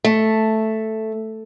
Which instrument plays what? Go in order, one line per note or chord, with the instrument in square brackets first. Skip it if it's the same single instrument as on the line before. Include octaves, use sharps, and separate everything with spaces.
[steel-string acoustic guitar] A3